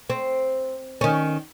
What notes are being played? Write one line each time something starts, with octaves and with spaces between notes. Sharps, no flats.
C4
D#3 C#4